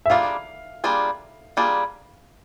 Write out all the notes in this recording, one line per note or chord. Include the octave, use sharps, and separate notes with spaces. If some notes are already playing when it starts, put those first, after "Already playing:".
E5
G3 A#3 D4 F4 G#4 F5
G3 A#3 D4 F4 G#4
G3 A#3 D4 F4 G#4